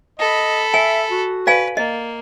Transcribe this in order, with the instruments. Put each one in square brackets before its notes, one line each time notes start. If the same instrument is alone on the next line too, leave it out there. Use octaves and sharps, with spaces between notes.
[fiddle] A4 B5 [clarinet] D#5
[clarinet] E5 [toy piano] G#5
[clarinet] F#4
[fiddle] B4 [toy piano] D5 F5 G#5
[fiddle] A#3 [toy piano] D#5